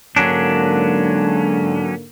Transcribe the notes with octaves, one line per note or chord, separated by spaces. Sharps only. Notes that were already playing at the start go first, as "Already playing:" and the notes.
G#2 D3 F#3 A#3 C#4 D4